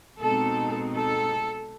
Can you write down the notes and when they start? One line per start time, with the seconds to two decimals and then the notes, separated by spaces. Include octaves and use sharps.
0.20 B2 G#3 C4 D#4 A4
0.96 A4